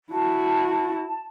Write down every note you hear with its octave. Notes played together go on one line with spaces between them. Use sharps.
E4 F#4 A5